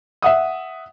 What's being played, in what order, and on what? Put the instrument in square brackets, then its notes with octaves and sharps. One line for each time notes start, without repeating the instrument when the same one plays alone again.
[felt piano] E5 F#5 D#6